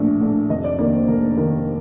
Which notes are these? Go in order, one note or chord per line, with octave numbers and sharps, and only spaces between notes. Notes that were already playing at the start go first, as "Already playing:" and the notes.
Already playing: A#1 A2 A3 D4
A2 A3 D4
F1 D#5
D5
D#2 D#3 A#3 D5
C5
F1 A#4
D#2 D#3 A#3